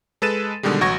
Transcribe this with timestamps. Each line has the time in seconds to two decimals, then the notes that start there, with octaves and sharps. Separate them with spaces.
0.22 G#3 A4 B4 A6 D#7 E7
0.63 B2 D3 D#3 G3 G#3
0.81 A1 F#3 F#4 C#6 G#6 A#6